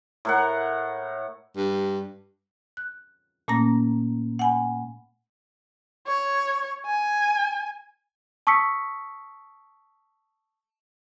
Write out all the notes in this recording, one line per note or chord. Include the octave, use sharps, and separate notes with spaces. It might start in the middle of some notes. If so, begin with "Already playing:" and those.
A2 A#4 F#5
G2
F#6
A#2 A3 A#3 C#4 A#5 A#6
F#5 G#5 B5
C#5
G#5
A5 C#6 D#6 E6 B6 C#7